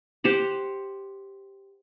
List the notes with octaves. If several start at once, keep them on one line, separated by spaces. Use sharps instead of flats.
G4 C5 F#5